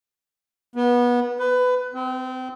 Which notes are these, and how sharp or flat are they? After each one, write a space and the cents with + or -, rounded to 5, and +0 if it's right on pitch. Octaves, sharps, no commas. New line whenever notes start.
B3 -25
B4 +20
C4 -30